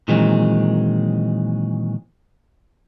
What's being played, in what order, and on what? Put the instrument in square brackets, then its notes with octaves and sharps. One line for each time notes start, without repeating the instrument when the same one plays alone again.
[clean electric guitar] A#2 D#3 E3 F#3 G#3 C4